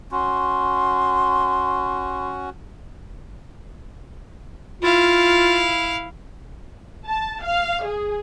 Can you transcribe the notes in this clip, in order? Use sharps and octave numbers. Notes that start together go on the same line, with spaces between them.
C#4 F#4 C6
E4 F4 F5
A5
F5
G#4